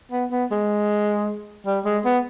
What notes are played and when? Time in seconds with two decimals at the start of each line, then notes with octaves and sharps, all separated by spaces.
0.12 B3
0.31 B3
0.51 G#3
1.66 G3
1.85 G#3
2.05 B3